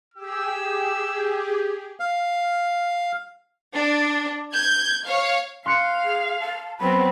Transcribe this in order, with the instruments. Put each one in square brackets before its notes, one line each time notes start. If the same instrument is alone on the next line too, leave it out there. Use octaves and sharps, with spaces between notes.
[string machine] G4 G#4 [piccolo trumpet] E6
[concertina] F5
[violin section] D4
G6 G#6
C#5 F5
[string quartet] F5 [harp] C6 F#6 C#7
[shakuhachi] G#4
A5
[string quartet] F#3 B3 C4 [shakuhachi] B5